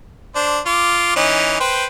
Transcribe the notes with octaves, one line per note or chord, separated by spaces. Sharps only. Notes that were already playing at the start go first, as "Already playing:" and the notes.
D4 C5
F4 D6
E3 C#4 D#4
B4 C5 G5